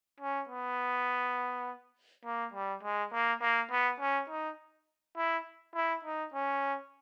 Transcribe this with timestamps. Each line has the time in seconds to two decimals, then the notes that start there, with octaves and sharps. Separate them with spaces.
0.20 C#4
0.49 B3
2.25 A#3
2.54 G3
2.83 G#3
3.12 A#3
3.41 A#3
3.71 B3
4.00 C#4
4.29 D#4
5.17 E4
5.75 E4
6.05 D#4
6.34 C#4